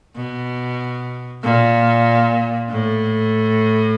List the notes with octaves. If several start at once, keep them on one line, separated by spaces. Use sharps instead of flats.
B2
A#2
A2